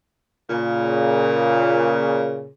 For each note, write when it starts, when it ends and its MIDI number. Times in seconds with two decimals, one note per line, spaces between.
0.50 2.49 46
0.50 2.49 49